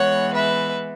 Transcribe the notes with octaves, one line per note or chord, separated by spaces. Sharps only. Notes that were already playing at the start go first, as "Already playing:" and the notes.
Already playing: E3 G#3 B3 C#5 F#5
B4 E5